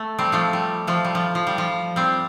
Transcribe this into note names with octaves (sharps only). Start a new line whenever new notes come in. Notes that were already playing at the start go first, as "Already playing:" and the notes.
Already playing: A3
G3 C4
F3 A3
G3
F3 A3
G3
F3
F3
G3
F3
G3 C4